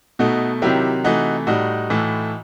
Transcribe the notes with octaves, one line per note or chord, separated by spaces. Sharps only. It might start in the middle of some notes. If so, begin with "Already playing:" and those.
B2 A3 D#4 F#4
C3 D#3 F#3 E4 G4
C3 E3 A3 D#4 F#4
A2 G3 D#4 F#4
A2 E3 A3